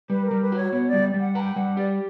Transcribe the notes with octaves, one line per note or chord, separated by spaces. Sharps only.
G3 B4
A#4
G3
B4
F#4 C#5
B3 C#5
D5
G3
G3
F#5
B4 G5 A#5
G3 F#5
G4 D5